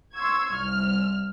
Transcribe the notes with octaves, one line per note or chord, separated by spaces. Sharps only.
C6 C#6 E6 G#6
C2 F6